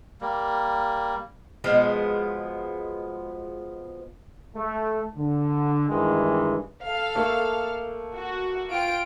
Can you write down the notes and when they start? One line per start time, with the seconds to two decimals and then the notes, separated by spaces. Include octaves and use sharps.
0.21 G3 A#3
1.64 B2 F3 G#3 B3
4.55 A3
5.16 D3
5.89 G2 D#3 E3 G#3
6.83 A4 F5
7.15 A3 A#3
8.14 F#4
8.70 F4 G5 D7